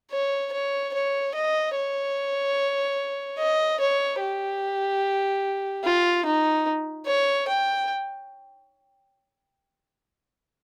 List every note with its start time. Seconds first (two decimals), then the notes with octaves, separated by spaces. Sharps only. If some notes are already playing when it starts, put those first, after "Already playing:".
0.11 C#5
0.52 C#5
0.93 C#5
1.35 D#5
1.75 C#5
3.38 D#5
3.80 C#5
4.20 G4
5.84 F4
6.25 D#4
7.06 C#5
7.47 G5